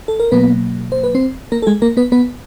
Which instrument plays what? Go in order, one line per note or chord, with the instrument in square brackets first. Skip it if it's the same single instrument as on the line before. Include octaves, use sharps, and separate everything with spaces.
[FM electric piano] A4
A#4
B2 F#3 A#3 B3 B4
C5
B4
C4 C5
A#3 A#4
A4
G#3 G#4
A#3 A#4
B3 B4
B3 B4